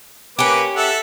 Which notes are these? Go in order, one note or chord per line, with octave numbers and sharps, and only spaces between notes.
A#3 C#4 G4 B4 D6
A4 E5 F#5